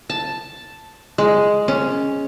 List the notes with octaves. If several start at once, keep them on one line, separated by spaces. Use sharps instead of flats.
A5
G#3
C#4